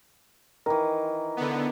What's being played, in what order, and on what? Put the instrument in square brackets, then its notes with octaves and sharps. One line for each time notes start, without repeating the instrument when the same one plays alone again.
[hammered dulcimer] D#3 E3 [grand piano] A#4
[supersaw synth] D3 B3